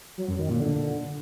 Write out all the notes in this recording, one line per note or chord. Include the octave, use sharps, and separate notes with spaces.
F#3
F#2
D#3
A#2
D3